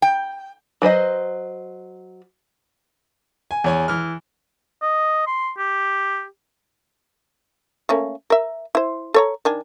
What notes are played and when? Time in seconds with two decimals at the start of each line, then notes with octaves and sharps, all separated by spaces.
0.02 G5
0.82 F#3 B4 C5 D#5
3.51 G#5
3.64 E2 C#5 G#5
3.88 E3 F6
4.82 D#5
5.27 C6
5.58 G4
7.89 A3 A#3 C#4
8.30 A#4 E5
8.75 E4 C5
9.14 A4 C#5 A#5
9.45 D#3 D4 G#5